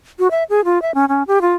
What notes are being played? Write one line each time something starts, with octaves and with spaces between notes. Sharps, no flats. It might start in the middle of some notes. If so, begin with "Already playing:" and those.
F#4
E5
G#4
F4
E5
C#4
C#4
G4
F4